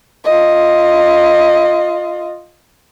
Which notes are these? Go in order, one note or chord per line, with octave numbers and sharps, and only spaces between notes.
F4 D#5